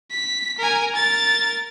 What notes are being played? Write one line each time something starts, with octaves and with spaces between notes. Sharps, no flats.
B6
A#4 G#5
A#4 A6